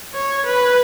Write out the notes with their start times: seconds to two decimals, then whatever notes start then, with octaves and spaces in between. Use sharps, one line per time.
0.14 C#5
0.46 B4